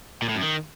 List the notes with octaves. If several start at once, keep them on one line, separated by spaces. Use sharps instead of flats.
A#2
A2
F#2
D#3